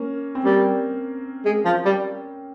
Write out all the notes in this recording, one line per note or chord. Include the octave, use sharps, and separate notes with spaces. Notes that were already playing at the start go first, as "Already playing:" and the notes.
Already playing: A#3 C#4
C4
G3 A#3
G#3
F3
G3